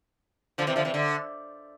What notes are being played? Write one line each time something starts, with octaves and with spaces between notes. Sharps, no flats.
D3 F3
C3 E3
D3 F3
C3 E3
D3